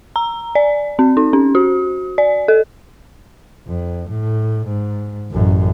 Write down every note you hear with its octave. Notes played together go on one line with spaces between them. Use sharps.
A#5
D5
C4
D#4
C#4
F#4
D5
A4
F2
A2
G#2
A1 F#2